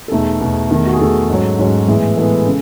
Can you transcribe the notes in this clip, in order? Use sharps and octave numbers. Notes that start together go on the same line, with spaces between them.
A4
E2 B2 A3 D#4 G#4
E2 B2 A3 D#4
E2 D#3 A3
F#4
G#4
E2 D#3 A3 A4
G#2 F#3 C#4
G#2 F#3 C#4
A2 E3 G#3 B3
A2 E3 G#3 B3 A4
C#3